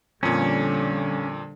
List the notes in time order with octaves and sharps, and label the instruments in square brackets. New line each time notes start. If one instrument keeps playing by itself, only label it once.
[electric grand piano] F2 A#2 [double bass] D3 G3 [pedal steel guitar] C#4